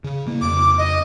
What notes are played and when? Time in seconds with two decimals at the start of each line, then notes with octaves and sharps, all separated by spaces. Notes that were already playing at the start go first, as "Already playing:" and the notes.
0.04 C#3
0.27 C#3 A#3
0.41 F2 C#3 D6
0.78 D#5